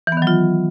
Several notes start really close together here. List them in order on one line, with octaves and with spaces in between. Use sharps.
E3 B3 D#3 F#3 F4